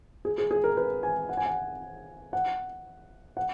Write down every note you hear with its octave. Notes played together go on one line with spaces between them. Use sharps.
G#4
G#4
G#4
A#4
B4
G#5
F#5
G#5
F#5
F#5
F#5